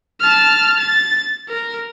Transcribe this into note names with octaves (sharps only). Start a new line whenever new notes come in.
A5 F6
A6
A#4